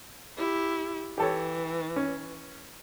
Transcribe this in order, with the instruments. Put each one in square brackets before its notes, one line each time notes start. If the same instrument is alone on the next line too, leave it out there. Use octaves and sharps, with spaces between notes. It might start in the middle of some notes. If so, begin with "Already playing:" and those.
[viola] E4 G4
[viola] E3 [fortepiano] G4 A4 C#5
[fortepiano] C#4